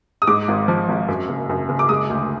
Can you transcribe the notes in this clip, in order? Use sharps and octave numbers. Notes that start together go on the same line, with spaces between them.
D#6
G#2 D6
G#1
F3
G#1
F#2
F#1
F#2
F#1
D6
G#3 D#6
D2